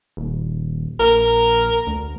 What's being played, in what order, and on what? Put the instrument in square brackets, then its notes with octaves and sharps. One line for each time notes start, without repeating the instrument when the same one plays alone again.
[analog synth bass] D#1
[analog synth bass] A#1 [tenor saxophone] A#4
[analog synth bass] D2